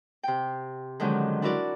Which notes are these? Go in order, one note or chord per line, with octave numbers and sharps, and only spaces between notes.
C3 G5
D3 D#3 F3 F#3 G#3 C#4
D4 E4 F#4 A#4 D5